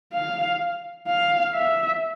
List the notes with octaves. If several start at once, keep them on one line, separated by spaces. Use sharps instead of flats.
F5
F5
E5